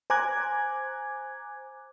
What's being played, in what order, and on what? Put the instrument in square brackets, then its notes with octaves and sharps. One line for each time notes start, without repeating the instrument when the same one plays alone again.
[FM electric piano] C5 G#5 A#5 D6 F#6 G#6